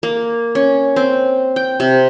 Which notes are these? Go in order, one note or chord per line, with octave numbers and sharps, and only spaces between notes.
A#3
C#4
C4
G5
C3